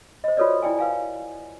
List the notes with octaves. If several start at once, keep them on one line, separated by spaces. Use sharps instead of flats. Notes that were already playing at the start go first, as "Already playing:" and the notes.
C5 D#5
F4 F#4 A4 B4 C#5 D5
E4 D5 G5 G#5
B4 F5 G#5